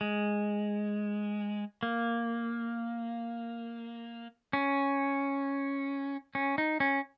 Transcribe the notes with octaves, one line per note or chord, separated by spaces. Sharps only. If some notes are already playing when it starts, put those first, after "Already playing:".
G#3
A#3
C#4
C#4
D#4
C#4